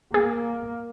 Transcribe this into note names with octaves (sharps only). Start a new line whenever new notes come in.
A#3 G#4